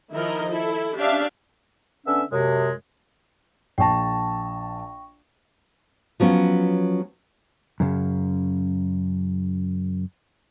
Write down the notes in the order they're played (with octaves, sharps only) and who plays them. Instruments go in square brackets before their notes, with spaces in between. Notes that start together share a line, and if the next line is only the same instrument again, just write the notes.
[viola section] D#3 F3 E4 A#4 D#5
E4 A4
C#4 D4 G4 E5 F5
[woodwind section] D3 B3 C#4 D4 E5 E6
F#2 C3 G#3
[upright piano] A#1 A5 [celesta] G5 C#6 A#6
[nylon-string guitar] F3 F#3 B3 C#4
[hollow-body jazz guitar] F#2 C#3